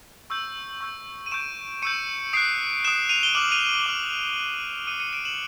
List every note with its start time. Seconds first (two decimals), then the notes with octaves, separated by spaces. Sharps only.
0.30 C#6 E6 G6
0.81 C#6 E6 G6
1.26 D#7
1.31 C#6 E6 G6 D7 E7
1.82 C#6 E6 G6 C#7 D#7
2.33 D#6 F#6 C7 D7
2.84 F#6 D7 E7
2.88 D#6
3.09 D#7 F7
3.23 G7
3.35 D6 F6 E7 F#7
3.52 D#7 F7
3.86 D6 F6
4.37 D#6 F#6
4.87 D#6 F#6 C#7 D#7
5.00 C#7 D#7
5.13 D7 E7
5.25 E7 F#7